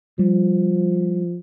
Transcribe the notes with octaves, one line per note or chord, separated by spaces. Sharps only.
F3 G3